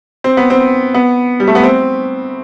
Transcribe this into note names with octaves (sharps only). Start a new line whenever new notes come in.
C4
B3
C4
B3
G3
A3
B3
C4